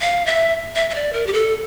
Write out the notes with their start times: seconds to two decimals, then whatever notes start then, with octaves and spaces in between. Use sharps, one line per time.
0.01 F5
0.26 E5
0.76 E5
0.90 E5
0.95 D5
1.13 A#4
1.27 G4
1.33 A4